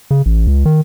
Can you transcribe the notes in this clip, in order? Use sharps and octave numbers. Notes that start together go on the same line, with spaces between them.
C#3
A1
C#2
D#3